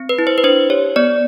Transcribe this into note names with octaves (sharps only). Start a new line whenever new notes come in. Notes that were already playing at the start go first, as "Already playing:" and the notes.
Already playing: C4
B4
E4
C5
B4
D4 C5
G4 C#5
B3 D5